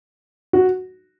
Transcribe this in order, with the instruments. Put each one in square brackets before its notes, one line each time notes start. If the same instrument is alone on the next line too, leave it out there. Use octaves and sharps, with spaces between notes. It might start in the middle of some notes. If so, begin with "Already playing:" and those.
[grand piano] F#4